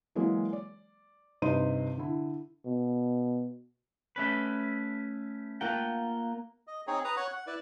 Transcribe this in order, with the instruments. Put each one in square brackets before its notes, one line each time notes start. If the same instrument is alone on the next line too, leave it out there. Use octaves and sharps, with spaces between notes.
[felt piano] E3 F#3 G#3 A#3
D5
G2 C3 D#4 B4 C6 D#7
D3 E4
[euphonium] B2
[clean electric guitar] A3 C#4 B4
[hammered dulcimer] A#3 A#5 [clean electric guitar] F4 F#5 G5
[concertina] D#5
C4 D#4 G#4 C#5
B4 A#5 D#6
C#5 F#5 C#6
F#5
E4 B4 D5